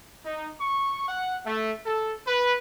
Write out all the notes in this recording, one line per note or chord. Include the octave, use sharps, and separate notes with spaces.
D#4
C#6
F#5
A3
A4
B4